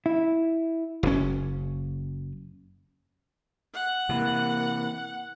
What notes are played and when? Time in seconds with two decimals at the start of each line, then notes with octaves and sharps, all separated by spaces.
0.06 E4
1.03 F#1 A#2 C#4
3.74 F#5
4.09 C3 E3 A#3